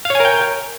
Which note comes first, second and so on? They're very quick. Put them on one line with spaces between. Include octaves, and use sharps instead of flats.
F5 C#5 G#5 A#4 G5